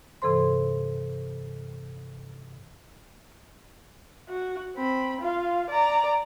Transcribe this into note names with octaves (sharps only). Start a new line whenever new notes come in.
G2 C3 E3 A4 C5 C6
F#4
C4 B5
F4 F5
D5 A#5